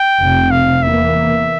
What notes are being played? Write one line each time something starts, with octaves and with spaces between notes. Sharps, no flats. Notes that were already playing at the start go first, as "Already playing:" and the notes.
Already playing: G5
F1 F2 C3
F5
E2 E3 A#3 E5